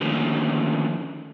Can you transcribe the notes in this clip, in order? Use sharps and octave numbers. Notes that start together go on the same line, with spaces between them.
D3 D#3 F3 A3 A#3 C#4